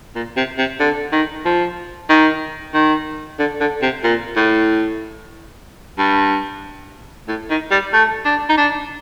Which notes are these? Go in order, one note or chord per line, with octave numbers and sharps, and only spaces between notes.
A#2
C3
C3
D3
D#3
F3
D#3
D#3
D3
D3
C3
A#2
A2
G2
A2
D#3
G3
A3
D4
D#4
D4